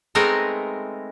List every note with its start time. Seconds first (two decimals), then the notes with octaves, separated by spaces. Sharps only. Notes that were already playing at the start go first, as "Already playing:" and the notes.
0.15 G#3 A3 B3 C4 D#4 A#4